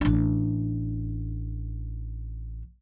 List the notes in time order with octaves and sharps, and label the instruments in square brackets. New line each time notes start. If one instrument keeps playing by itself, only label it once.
[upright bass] A1 D4